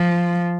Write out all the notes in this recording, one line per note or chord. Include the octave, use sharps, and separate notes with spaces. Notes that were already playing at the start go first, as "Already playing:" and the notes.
Already playing: F3